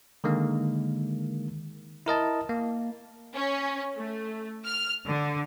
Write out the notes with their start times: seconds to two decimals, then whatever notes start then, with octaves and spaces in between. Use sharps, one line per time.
0.24 D3 D#3 G#3 A#3
2.06 E4 A#4 D#5 A5
2.49 A#3
3.35 C#4
3.97 A3
4.65 F6
5.06 D3